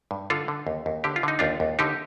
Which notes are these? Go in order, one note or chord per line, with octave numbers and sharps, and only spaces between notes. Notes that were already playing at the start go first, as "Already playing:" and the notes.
G2
D3 F4 A4
D3
D#2
D#2
D3 G4
F4
D3 D#4
D#2 D4 F4
D#2
D3 D#4 G4